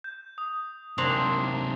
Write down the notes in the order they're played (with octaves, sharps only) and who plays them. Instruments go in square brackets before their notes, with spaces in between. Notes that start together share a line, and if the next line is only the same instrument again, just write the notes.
[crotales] G6
D#6
[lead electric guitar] F#2 C3 [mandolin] A#3 C4 D4 [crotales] D6 F7